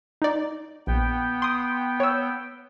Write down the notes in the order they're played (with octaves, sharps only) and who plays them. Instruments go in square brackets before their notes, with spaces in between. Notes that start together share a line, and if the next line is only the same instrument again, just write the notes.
[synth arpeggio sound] D#4 D5
[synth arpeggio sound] A#1 [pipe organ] B3 G5
[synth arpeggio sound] C6 D#6
C#5 E6